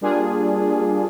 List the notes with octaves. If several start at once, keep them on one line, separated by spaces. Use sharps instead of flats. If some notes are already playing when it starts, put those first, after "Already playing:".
G3 A#3 D4 F4 G#4